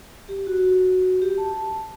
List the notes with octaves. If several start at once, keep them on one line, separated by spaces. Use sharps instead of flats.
G4
F#4
G4
A5